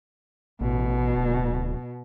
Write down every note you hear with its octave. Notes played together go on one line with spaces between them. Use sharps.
A1 B2
D1